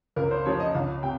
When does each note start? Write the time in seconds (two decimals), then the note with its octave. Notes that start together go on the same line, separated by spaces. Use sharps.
0.16 C#2 A#4
0.31 C5
0.45 C#3 F3 C#5
0.60 D#5
0.75 C#2 F5
1.03 C3 G5